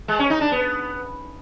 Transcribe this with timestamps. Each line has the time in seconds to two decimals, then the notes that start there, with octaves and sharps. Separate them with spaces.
0.08 G#3
0.19 C#4
0.30 D#4
0.41 D4
0.52 B3